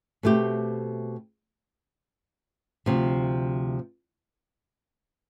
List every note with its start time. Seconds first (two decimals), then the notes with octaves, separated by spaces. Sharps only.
0.23 B2 A3 C4 G4
2.86 D2 C3 F3